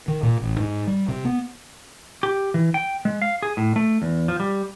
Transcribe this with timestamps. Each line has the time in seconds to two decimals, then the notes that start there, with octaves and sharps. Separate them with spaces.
0.08 D#3
0.23 A#2
0.42 A1
0.60 G#2
0.87 G3
1.08 C3
1.25 B3
2.23 G4
2.54 E3
2.74 G5
3.05 G#3
3.22 F5
3.43 G#4
3.57 A2
3.76 A3
4.02 E2
4.28 F3
4.40 G3